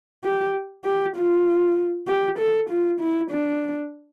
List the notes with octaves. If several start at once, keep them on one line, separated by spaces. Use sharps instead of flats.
G4
G4
F4
G4
A4
F4
E4
D4